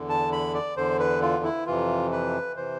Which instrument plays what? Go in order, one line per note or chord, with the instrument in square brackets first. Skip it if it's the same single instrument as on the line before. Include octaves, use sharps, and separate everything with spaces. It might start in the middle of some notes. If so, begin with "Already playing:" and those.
Already playing: [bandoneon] E2 D3
A5
B5
D5
E2 D3 C5
B4
F4
E4
F2 C3 E3 F4
B4
C3 E3 C5